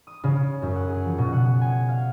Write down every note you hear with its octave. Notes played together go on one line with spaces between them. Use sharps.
D#6
C#3
F#2
F#5
G#4
F3
B2
F#5
G#5
F5